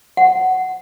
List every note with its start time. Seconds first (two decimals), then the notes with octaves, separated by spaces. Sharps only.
0.17 F#5